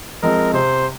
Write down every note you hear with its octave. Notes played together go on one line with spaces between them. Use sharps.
F3 G#3 C4 A#4
C3 C5